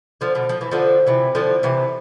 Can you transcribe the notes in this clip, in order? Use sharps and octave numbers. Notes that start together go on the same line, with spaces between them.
D3 F3
B2 D3
F3
E3
D3 F3
C3 E3
D3 F3
C3 E3